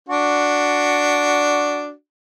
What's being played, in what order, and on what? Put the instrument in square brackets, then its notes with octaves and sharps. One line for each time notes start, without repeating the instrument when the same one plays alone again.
[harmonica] D4 F#4